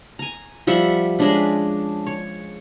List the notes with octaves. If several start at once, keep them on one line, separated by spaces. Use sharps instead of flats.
G#5 A#5
F3 G3 E5 F#5
G#3 C#4 D4 B4
C#5